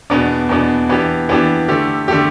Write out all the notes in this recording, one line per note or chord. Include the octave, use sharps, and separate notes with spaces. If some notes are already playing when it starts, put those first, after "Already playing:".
E2 B2 B3 D4
E2 B2 B3 D4
E3 B3 D4 G4
E3 B3 D4 G4
D3 A3 G4
D3 A3 G4